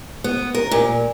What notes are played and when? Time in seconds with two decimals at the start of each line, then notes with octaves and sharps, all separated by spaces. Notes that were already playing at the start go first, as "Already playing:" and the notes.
0.24 B3
0.55 A#4
0.71 A#2